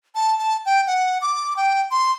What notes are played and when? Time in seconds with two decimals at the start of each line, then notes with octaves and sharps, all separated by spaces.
0.15 A5
0.39 A5
0.66 G5
0.87 F#5
1.22 D6
1.57 G5
1.91 C6